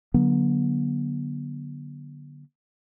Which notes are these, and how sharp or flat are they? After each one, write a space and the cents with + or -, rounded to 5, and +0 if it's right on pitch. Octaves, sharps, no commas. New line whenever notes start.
D3 +0 F#3 +0 B3 -40